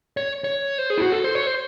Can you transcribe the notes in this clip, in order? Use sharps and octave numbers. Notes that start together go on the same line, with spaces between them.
C#5
C#5
C5
G#4
E4
F#4
A4
C5
C#5
C5